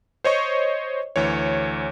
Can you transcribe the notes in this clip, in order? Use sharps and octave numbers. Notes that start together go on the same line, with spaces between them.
C5 C#5 D#5 C#6
D2 E3 C#5